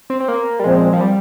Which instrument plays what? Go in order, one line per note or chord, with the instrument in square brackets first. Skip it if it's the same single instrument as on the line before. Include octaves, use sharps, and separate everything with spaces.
[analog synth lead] C4
C4
A#3
G3
[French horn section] A#2 F3 C4 [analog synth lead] G#3
[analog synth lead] F3
G3